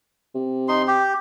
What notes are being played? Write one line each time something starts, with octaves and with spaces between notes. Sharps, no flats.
C3
D#4 C6
G4